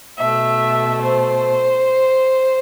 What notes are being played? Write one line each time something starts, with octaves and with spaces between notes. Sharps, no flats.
B2 A3 E5
C5